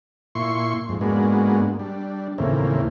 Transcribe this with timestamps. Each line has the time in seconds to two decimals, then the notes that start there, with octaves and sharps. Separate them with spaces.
0.35 A#2 E4 C6 C#6
0.89 F2 G#2
1.01 G#2 G#3 A#3 B3 D4 F#4
1.79 G3 D4
2.38 D#2 A2 C#3 E3 A#3 C4